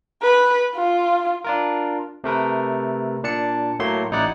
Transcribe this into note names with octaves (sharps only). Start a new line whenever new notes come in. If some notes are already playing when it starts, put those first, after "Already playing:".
B4
F4
D4 F4 A#4
C3 A3 A#4 B4
A#2 D4 A5 C#7
A2 F#3 A3 A#3 C6
A1 D#4 E4 D5 F#5